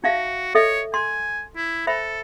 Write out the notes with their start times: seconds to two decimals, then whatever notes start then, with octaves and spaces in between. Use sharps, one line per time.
0.04 D#4 F#4 E5 F5
0.55 A4 C#5 D#5 E5
0.94 G#5 C6
1.56 E4
1.87 A4 C5 E5 B5